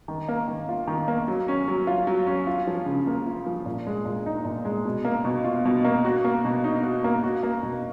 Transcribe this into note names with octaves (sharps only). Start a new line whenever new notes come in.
D#3
A#3
D#3
F4
D#3
A#3
F#3
C#4
F#3
F4
F#3
C#4
F4
F3
C#3
A#3
F4
F3
A#2
G#3
A#2
D#4
A#2
G#3
B2
A#3
B2
F4
B2
A#3
F#4
A#3
B2
D#4
F#4
A#3
F#4
A#3
B2